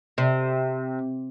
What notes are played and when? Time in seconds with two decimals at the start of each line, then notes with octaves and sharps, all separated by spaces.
0.18 C3